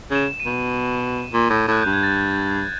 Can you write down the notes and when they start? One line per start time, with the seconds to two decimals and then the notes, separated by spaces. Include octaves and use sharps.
0.11 C#3 E7
0.40 D#7
0.46 B2
1.33 A#2
1.50 A2
1.68 A2 F#6
1.82 G2 G6
1.93 G#6
2.03 A6